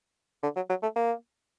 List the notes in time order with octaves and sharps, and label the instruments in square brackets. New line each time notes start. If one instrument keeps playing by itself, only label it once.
[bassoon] D3
F#3
F#3
A3
A#3